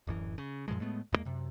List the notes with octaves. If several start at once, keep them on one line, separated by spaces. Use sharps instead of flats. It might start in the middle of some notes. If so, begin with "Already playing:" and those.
D1 F#2 E3
C#3
F#2 A#2 F3 G#3
A2 G#3 A3 B3
E2 G2 G#3 A#3
F#2 C3